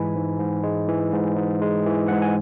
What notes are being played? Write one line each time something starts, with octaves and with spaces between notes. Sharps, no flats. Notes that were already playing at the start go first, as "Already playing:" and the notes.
Already playing: G#2 E3 G#3 G#5 B5
G#2
G#2
G#3
E3
G#2
G#2
G#3
E3
G#2 F#5
G#5